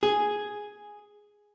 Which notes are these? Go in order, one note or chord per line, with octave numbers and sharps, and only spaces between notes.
G#4